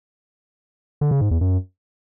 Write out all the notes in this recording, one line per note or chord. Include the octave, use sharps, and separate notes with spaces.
D3
C#3
G#2
E2
F#2